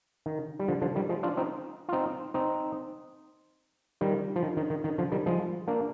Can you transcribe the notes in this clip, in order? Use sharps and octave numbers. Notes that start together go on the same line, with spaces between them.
D#3
G3
D3 F3
D3 F3
D#3 G3
F3 G#3
D4 F4
C4 D#4
F4
C4 D#4
C4 D#4
D#3 G3
F3
D#3
D#3
D#3
D#3
D3 F3
D#3 G3
F3 G#3
A#3 D4